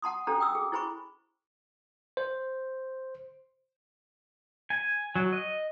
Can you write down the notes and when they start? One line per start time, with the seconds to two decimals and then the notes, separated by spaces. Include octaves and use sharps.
0.02 F#5 A5 C6 D#6
0.27 C#4 D4 G4 A4 C5 A#5
0.40 G5 D#6 E6
0.55 G#4
0.72 E4 G#4 C5 G#5 B5 C#6
2.17 C5
4.70 G#5
5.15 F#3
5.33 D#5